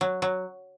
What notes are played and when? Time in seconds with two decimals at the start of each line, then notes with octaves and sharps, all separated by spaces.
0.01 F#3
0.22 F#3